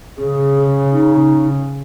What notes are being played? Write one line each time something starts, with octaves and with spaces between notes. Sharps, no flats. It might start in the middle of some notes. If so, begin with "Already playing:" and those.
C#3 G#4
D#4